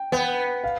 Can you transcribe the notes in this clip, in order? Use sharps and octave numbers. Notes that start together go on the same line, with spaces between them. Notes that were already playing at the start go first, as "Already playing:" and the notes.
Already playing: G5
B3 G5
F5